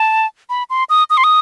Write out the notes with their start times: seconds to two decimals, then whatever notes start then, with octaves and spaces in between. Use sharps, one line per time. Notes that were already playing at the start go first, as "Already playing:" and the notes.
Already playing: A5
0.50 B5
0.70 C6
0.90 D#6
1.10 D#6
1.17 C6
1.24 D#6